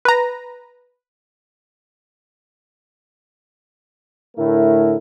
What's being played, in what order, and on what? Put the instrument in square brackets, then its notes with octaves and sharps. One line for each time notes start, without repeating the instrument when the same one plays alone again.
[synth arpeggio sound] B4 A#5
[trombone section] A2 D3 A3 E4 A#4